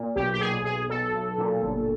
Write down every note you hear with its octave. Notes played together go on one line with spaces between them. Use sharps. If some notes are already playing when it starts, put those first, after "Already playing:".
Already playing: A#2
B1 G4
G4
B1 G#4
B1 G#4
B1 A4
B1
A#2
G1